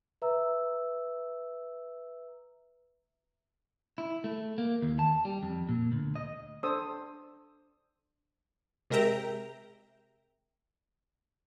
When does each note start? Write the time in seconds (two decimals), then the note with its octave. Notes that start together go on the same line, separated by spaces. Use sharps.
0.22 B4 E5 A#5 E6
3.98 E4
4.24 A3
4.58 A#3
4.82 D#2
4.99 A5
5.25 G3
5.43 F2
5.69 A#2
5.92 D2
6.16 D#5
6.63 D4 A4 C5 D#6 E6
8.90 C3 G#3 A#4 E5 G5 A#5